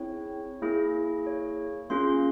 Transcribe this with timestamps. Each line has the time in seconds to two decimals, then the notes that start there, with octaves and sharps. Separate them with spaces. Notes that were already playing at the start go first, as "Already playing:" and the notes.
Already playing: C4 E4 G#4 C#5
0.62 A#3 E4 G#4
1.27 C#5
1.90 A#3 C#4 F4 G#4 C6